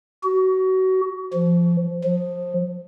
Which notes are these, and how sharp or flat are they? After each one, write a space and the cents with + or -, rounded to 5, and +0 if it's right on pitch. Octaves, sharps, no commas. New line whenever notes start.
F#4 +25
F3 -15
F3 +20